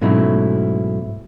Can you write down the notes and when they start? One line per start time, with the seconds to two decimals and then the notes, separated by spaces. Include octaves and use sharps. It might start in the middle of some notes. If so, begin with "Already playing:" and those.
0.01 G#2 B2 F#3 A3 C#4 E4